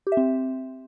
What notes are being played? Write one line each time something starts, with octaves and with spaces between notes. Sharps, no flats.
G4
E5
C4